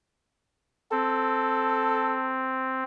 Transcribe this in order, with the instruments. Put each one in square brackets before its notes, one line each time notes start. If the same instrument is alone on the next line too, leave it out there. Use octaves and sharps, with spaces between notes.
[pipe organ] C4 [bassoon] A4